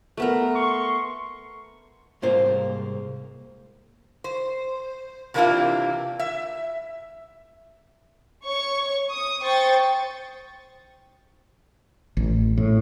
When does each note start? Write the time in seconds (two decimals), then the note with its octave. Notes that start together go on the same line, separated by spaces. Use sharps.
0.17 A3 B3 A#4
0.54 C6 C#6
2.22 C2 G#2 A#3 F4 C5 F5
4.24 C5
5.34 C3 E3 A#3 D4 E4 F4
6.19 E5
8.45 C#5 C#6
9.11 D#6
9.43 C5 G5 C#6 A6
12.17 A1
12.58 A2